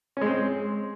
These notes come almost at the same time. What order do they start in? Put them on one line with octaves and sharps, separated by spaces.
C#4 G#3 C4